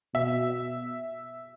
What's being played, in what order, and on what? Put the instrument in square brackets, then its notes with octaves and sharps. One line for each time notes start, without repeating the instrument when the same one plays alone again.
[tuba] B2 [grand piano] E5